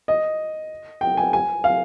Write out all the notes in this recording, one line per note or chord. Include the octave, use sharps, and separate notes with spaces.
D#5
G5
G#5
G#5
F5